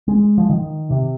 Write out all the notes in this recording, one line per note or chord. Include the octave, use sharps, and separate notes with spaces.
G#3
F3
D#3
C3